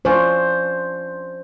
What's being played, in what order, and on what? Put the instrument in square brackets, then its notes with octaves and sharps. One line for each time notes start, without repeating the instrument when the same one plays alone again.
[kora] F3 C#4 D4 [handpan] C5